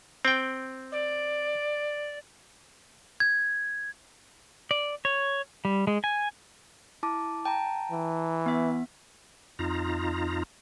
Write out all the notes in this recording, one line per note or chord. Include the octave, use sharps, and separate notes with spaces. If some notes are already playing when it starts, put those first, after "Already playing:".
C4 G5
D5
G#6
D5
C#5
G3
G#3
G#5
E4 A5 D6
G5 A5 A#5
E3
B3 E5
F2 D#4 F4 A#5